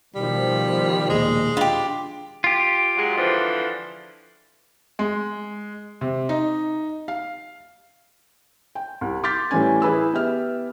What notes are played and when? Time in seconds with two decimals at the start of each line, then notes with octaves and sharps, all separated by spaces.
0.15 B2 D#3 F3 G3
1.10 D#2 A#2 G#3
1.57 D4 F4 G4 B5
2.44 F4 G4
2.96 F#3 G#3
3.16 D3 E3 F3
4.99 G#3
6.01 C3
6.29 D#4
7.08 F5
8.75 G5
9.01 C2
9.23 C6 D6 F6 G6 A6 B6
9.51 A2 E3 G3 C#4 G#5
9.82 E4 G#4 B4 B5 E6
10.13 B3 G4 E5 F6